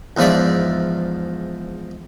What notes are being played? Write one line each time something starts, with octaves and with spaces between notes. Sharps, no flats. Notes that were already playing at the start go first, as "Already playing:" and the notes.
E2 G#2 F3 D5 E5